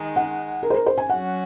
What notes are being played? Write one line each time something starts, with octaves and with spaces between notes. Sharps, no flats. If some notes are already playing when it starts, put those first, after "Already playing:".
Already playing: D#3 G#3 D#4
F#5
A#4
C5
A#4
C5
G#5
F#3 C#4 F#4 F#5